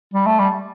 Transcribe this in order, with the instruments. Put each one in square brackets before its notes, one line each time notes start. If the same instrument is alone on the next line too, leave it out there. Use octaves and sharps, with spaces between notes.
[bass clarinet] G3
A3
G3